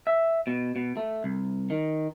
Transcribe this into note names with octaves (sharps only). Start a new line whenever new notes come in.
E5
B2
B2
A3
C2
D#3